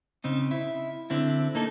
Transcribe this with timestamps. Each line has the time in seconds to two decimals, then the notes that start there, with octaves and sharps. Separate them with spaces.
0.24 C#3 C4 D#4
0.51 E4
1.10 D3 C4 E4
1.55 A#3 D#4 A4